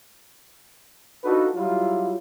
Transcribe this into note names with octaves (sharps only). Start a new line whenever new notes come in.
D4 D#4 F4 F#4 A4 B4
F#3 G3 E4 F4